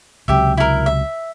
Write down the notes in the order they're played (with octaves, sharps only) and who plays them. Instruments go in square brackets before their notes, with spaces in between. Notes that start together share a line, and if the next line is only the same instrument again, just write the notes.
[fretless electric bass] C#2 C3 F#3 [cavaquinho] G4 E5
[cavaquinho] E4 A#4
E5